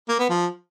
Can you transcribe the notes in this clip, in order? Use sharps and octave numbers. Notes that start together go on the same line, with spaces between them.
A#3
B3
F3